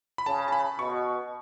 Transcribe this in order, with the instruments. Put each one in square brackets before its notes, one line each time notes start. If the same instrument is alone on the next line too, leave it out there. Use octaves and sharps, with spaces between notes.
[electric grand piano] B5
[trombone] C#3 [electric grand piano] A5
[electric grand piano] A5
B5
[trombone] B2 [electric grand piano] C#6